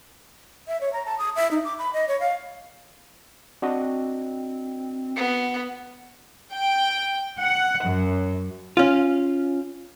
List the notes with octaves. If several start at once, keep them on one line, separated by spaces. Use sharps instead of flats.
E5
C#5
A#5
A5
D#6
E5
D#4
D6
B5
D#5
C#5
F5
C4 D4 F#4 D#5
B3
G5
F#5
F#2
C#4 F4